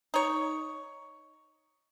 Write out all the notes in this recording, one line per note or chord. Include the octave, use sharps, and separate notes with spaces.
D#4 C#5